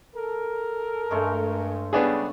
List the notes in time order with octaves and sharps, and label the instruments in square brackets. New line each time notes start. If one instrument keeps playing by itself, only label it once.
[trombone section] A4 A#4
[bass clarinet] G2 [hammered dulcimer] G#3 A3 C#4
[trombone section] C#3 G3 [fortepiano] B3 D4 G#4